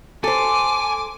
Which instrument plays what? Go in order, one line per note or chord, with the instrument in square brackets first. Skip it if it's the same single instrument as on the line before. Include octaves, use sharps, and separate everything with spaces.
[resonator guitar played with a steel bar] A4 C5 [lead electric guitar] G#5 [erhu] D6